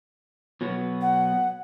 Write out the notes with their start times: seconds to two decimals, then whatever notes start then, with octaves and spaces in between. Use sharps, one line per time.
0.61 B2 F#3 B3
1.01 F#5